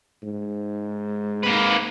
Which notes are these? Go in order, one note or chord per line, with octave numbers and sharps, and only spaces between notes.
G#2
A#3 B4